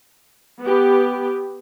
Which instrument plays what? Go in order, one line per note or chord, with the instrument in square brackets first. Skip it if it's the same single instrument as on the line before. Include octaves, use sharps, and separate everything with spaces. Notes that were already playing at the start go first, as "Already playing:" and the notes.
[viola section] B3 G4